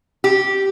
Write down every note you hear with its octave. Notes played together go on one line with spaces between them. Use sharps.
G4